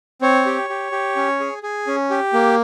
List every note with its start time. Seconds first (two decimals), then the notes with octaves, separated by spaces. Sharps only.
0.21 C4 C#5
0.46 G4
0.69 G4
0.92 G4
1.16 C#4
1.40 G#4
1.63 G#4
1.87 C#4
2.10 G4
2.33 A#3